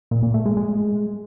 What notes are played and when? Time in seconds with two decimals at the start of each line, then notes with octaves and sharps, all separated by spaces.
0.11 A#2
0.23 A#2
0.34 A3
0.45 G#3
0.57 G#3